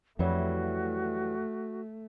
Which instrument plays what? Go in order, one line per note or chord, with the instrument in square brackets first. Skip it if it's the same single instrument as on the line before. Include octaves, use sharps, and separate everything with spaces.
[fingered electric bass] F2 [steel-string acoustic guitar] E3 F#3 G3 [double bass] A3 [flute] F#4